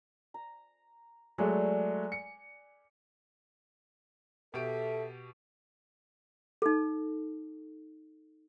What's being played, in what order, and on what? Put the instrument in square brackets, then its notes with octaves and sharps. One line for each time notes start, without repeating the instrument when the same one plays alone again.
[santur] A#5
[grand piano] F#3 G#3 A3 [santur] D5 G#5
[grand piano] C#7
[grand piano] B2 G4 D7 [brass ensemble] A4 [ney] E5
[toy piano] D#4 A4